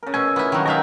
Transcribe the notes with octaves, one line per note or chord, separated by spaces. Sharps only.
C#3 A#4
B2 C#4 G#5 E6
B3 E4 F4
D#3 F#3 G3 F#4
B2 G#3 D#4 A#4 E5 F5 G5 A5